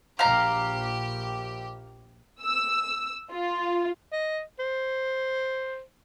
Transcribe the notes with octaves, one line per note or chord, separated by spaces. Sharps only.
A#1 G4 F5 A#5
E6
F4
D#5
C5